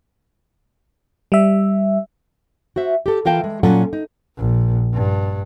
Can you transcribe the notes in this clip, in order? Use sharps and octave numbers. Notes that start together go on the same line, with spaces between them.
G3 E5
F#4 C5 E5
G4 A4
E3 F4 A#4 F5 G5 A5
G#3
A#2 F#3 C#4 F4 A4 F#5
D#4
A#1
G2